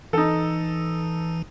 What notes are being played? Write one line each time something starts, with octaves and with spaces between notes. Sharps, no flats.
E3 D#4 A4